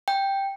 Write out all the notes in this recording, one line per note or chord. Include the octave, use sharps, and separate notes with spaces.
G5